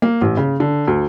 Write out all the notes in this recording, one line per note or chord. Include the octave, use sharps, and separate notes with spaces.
A#3
A1
C#3
D3
D2